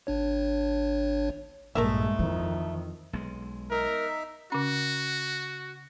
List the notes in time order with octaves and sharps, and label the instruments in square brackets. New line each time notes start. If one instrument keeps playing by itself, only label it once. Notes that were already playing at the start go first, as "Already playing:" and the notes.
[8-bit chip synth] G#1 D4 C#5
[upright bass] A#1 [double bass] G2 G#3 [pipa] A3 A#4 E5
[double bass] F2 D#3 [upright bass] E3
[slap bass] B1 G#3
[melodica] D#4 E5 [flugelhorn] A#4
[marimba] C#3 C#4 [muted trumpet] F#4